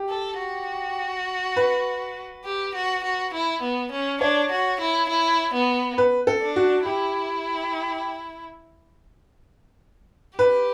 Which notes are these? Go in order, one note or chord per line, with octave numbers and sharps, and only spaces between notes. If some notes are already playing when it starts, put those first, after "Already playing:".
Already playing: G4
A4
F#4
B4
G4
F#4
F#4
E4
B3
C#4
D4 C#5
F#4
E4
E4
B3
B4
A4
D4
F#4
E4 G4
G4 B4